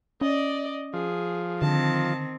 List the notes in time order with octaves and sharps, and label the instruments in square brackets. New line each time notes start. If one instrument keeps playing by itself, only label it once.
[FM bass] C#4 [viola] D5 D#5
[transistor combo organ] F3 [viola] G#4
[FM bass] D3 [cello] D#3 C4 [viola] A5